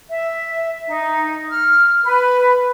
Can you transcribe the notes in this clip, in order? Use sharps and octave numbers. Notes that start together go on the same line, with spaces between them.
E5
D#4
F6
B4